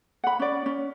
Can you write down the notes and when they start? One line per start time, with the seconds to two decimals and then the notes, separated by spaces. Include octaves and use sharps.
0.24 F#5 B5
0.39 C#4 D5
0.66 C#4